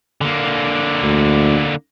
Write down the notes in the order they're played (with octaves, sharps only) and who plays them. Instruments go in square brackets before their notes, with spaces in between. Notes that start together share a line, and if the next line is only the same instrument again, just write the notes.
[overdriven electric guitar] D3 A#3
[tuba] D2